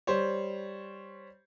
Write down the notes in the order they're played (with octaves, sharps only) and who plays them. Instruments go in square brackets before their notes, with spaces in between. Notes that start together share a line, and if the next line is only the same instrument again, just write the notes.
[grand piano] G3 C5 C#5